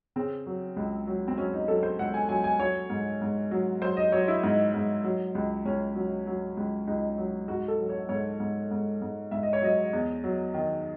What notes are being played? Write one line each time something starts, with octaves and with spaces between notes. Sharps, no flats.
C#3 C4
F#3
C#2
F#3
C4
F#3 C#4
D#4
F#3 A4
C5
C#2 F#5
G#5
F#3 G#5
G#5
F#3 C#5
G#2
G#2
F#3
F#3 C5
D#5
F#3 C#5
E4
G#2 D#4
G#2
F#3
C#2
C#2 C#4
F#3
F#3
C#2
C#2 D#4
F#3
G#2 F#4
A4
F#3
C#5
G#2 C#5
G#2
G#2
G#2
G#2 E5
D#5
C#5
F#3 D#5
E2
F#3
D#3